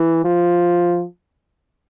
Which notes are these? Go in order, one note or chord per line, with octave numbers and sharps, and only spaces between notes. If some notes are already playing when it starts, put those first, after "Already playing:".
Already playing: E3
F3